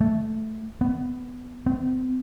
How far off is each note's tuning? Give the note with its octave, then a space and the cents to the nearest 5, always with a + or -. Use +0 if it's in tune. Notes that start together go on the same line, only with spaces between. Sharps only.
A3 -5
B3 +15
C4 -35